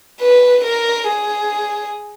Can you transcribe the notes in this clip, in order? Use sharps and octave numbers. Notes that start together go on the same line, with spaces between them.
B4
A#4
G#4